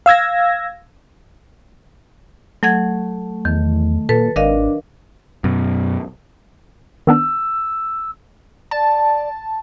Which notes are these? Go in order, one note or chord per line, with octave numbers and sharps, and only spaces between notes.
F5 E6 G#6 A#6
F#3 A3 F#5 G#6
E2 D#3
A#2 A4 B4
G#1 D4 A#4 D#5 F5
F#2 B2
D#3 B3 D4 E6
D5 A5